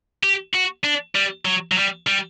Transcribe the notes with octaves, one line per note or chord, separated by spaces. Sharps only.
G4
F#4
D4
G3
F#3
F#3
G3
G3